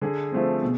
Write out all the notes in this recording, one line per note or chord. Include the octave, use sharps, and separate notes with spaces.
D3 G#4
F3 A3 C4
B2